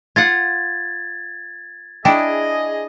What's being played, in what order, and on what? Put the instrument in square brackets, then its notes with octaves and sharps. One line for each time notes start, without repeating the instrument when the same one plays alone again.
[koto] F4 F5 F#5 [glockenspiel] G#6 A6
[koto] D4 E4 [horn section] G#4 D#5 [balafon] G5